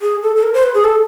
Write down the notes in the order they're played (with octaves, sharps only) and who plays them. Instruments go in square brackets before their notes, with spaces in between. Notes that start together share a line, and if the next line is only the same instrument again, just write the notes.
[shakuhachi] G#4
A4
A4
A#4
C5
B4
G#4
A4